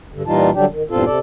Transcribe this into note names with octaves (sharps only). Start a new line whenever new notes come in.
G2 D3
A#2 E3 G3 D#4 F4 A5
D3 F#3 G3 D4 G4
D#3
E2 G2 A#2 C4 F4 A4
C3 A4 D5